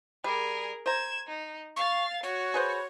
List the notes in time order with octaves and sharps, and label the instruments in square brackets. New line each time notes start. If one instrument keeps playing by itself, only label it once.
[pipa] G3 [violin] G#4 A#4
[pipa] C5 A#5 [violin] G#6 E7
[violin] D#4
[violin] F5 A6 [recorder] C#6
[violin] F#4 [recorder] C#5
[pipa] G#4 B4 C5